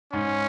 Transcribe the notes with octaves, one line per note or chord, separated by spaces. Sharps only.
G#2 C#4